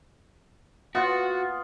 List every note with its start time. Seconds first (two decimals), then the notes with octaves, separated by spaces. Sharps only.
0.95 B3 F4 F#4 F#5